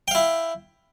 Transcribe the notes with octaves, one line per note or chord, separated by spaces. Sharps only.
E4 F5 G5